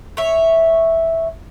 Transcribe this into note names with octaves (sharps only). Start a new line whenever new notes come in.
C#5 E5